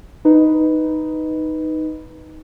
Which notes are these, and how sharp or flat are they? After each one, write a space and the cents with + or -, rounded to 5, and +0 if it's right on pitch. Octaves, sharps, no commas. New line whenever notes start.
D#4 +0 B4 +0